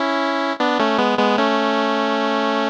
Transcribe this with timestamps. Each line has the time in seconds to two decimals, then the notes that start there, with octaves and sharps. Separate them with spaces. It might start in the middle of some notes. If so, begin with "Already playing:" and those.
Already playing: C#4 E4
0.60 B3 D4
0.79 A3 C#4
0.99 G#3 B3
1.18 G#3 B3
1.38 A3 C#4